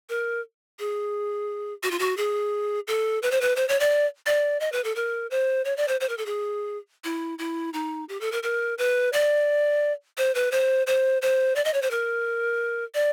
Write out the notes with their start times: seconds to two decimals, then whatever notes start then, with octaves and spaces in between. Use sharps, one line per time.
0.09 A#4
0.79 G#4
1.83 F#4
1.91 F4
1.99 F#4
2.17 G#4
2.88 A4
3.23 B4
3.31 C5
3.41 B4
3.56 C5
3.69 C#5
3.80 D5
4.26 D5
4.60 D#5
4.72 B4
4.84 A4
4.96 A#4
5.31 C5
5.65 C#5
5.77 D5
5.88 C5
6.00 C5
6.09 A#4
6.18 A4
6.26 G#4
7.04 E4
7.39 E4
7.73 D#4
8.09 G4
8.21 A4
8.32 A#4
8.43 A#4
8.78 B4
9.13 D5
10.18 C5
10.35 B4
10.52 C5
10.87 C5
11.22 C5
11.56 D5
11.65 D#5
11.74 C#5
11.82 C5
11.91 A#4
12.95 D5